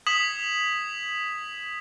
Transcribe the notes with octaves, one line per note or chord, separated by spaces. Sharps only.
D#6 G#6 B6 E7 F#7